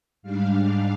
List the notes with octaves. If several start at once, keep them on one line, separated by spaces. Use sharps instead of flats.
G#2 G3 D4 F5